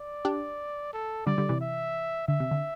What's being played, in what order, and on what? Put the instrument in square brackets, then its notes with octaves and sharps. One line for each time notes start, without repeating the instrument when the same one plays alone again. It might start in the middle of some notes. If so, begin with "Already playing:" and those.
Already playing: [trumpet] D5
[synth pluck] D4 G4
[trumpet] A4
[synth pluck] D3 G3 [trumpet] D5
[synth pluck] D3 G3
C3 E3
[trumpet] E5
[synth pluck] D3 [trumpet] E5
[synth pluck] C3
D3